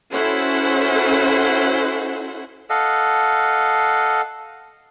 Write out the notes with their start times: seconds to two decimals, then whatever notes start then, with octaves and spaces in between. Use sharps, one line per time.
0.12 C#4 E4 F#4 A4 C5 F#5
2.70 A4 D#5 F5 F#5